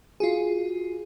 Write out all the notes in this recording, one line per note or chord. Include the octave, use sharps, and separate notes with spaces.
F4 F#4 G#4